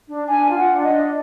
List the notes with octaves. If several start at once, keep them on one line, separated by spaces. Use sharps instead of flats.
D4
D4 G#5
F4
F#5
D4
D#5
D4